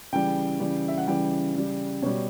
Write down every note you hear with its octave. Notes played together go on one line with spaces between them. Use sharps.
C#3 E3 G3 G5
C#3 E3 G3
E5
F#5
C#3 E3 G3 G5
C#3 G3
B2 G3 C#5